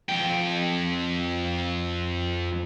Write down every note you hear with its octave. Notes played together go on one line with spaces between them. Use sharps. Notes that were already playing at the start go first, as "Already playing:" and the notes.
F2 G5